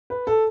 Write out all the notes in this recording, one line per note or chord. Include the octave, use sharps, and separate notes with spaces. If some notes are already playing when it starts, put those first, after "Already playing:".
B4
A4